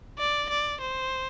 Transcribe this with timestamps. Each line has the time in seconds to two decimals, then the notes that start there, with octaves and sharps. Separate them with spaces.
0.18 D5
0.50 D5
0.81 C5